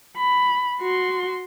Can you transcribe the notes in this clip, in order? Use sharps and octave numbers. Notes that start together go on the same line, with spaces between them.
B5
F#4 C6